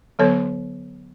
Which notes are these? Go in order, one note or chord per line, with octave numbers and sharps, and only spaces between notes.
D3 F#3 B3 A4 C#5